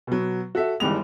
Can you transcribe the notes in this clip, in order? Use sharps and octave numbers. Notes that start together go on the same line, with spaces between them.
B2 F#3
F#4 A4 E5
G1 D#3 E3 G3 G#3 F7